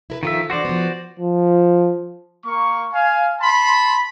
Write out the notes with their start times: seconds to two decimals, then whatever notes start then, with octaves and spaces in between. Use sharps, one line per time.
0.10 E4 A#4 B4
0.23 D#3 F3 F4 A4 E5
0.50 E3 D4 F#4 C5 D5
0.65 F3 B3
1.19 F3
2.43 A#3 C#6
2.93 F5 G#5
3.40 A5 B5 C6